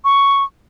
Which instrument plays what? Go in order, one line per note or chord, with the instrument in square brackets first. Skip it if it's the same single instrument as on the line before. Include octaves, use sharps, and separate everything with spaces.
[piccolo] C#6